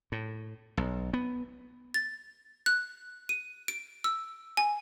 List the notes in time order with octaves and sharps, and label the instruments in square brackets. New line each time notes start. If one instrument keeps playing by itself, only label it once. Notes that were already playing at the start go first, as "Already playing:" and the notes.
[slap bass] A2
B1
B3
[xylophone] A6
F#6
D#7
D7
E6
G#5